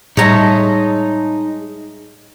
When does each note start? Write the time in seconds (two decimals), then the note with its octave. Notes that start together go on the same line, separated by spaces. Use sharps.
0.17 A2 G3 G#3 D#4 C#5 E5 A5 A#5